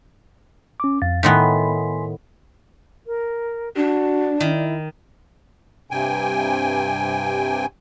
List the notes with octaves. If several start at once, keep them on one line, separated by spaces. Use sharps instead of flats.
C#4 D6
F2 F5 A6
A2 D#3 B3 G#5 C6 B6
A#4
D4 F#4 D5
D#3 E4
G2 C3 G5 G#5